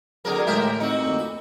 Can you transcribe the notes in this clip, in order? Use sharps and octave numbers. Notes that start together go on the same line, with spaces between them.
D3 F#3 C4 D4 G#4 A#4
A2 D3 E3 G#3 G4 A#4 E5
C4 D#4 F#4
F2 A#2 D3
B5